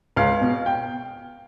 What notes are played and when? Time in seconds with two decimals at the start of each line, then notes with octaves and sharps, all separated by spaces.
0.16 C#2 F5
0.41 B2
0.66 G5